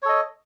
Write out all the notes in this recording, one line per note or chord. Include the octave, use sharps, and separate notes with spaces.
A4 C#5 D#5